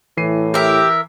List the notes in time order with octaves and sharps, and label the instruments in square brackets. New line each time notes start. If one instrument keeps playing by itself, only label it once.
[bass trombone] A2 [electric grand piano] E3 C7 D#7
[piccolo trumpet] G4 [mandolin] A#4 E5